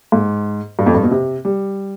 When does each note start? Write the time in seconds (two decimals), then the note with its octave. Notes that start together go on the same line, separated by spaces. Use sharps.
0.12 G#2
0.79 G2
0.86 F2
0.95 G2
1.04 B2
1.11 C3
1.45 G3